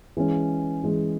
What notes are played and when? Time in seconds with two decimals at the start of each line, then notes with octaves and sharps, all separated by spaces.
0.17 E3 G#3 C#4
0.84 E3 G#3 C#4